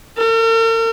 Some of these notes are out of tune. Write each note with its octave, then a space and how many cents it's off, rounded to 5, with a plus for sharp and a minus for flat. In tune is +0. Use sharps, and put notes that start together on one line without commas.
A#4 -45